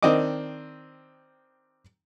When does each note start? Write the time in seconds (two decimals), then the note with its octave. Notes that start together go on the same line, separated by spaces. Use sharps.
0.03 D#3 C4 D4 D#5 D6